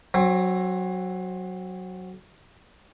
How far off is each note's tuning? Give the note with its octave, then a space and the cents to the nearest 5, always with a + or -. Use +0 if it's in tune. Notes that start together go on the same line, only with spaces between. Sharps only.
F#3 +0 C4 +25